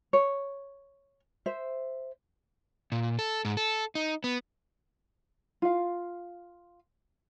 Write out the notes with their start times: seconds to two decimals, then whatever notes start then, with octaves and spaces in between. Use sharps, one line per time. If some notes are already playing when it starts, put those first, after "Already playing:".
0.13 C#5
1.46 C5 E5
2.92 A#2
3.19 A4
3.45 G#2
3.57 A4
3.95 D#4
4.24 B3
5.62 F4 F5